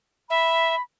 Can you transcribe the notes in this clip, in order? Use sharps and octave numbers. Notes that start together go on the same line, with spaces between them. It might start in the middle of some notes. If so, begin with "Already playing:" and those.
E5 B5